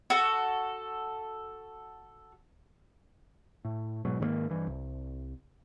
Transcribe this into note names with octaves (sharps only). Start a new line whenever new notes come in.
F#4 A4
A2
G#2 B2 F#3
G#2 D#3 G#3 A#3
G2 E3
C2